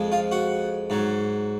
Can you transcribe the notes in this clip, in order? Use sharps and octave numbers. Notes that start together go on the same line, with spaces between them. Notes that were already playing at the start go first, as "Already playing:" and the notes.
Already playing: F2 F3 G#3
F4
F#4
G#2 F#3